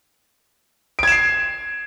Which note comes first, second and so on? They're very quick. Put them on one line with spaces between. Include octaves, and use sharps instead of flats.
D7 G#6 E7 C7